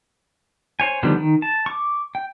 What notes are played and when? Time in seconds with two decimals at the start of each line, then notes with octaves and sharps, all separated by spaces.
0.80 C5 C#5 G#5
1.03 D3 D#3 F3 G3 B3
1.17 D#3
1.42 A5
1.66 C#6 D6
2.15 G5